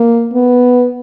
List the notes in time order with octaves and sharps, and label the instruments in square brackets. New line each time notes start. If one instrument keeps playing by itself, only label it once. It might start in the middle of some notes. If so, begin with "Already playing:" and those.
Already playing: [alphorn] A#3
B3